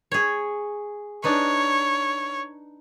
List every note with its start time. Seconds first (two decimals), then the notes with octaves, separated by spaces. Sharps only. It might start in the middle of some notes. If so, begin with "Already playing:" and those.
0.12 G#4 C#5
1.24 D4 D#4 B4 C#5